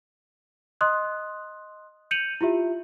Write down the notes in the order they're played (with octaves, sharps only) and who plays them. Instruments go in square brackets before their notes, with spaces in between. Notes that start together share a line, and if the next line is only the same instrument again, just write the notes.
[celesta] D#5 C6 D#6 F#6
G6 C#7 D#7 F7 F#7
E4 F4 G4 E5